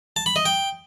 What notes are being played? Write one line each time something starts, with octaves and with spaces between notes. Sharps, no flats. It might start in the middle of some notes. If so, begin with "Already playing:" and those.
A5
B5
D#5
G5